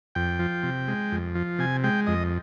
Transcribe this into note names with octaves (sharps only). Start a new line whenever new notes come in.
F2 G5
F3
C3
G#3
F2
F3
C3 G#5
G#3 G5
F2 D#5